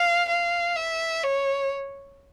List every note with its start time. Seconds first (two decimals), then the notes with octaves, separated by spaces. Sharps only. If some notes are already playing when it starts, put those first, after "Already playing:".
Already playing: F5
0.29 F5
0.76 E5
1.24 C#5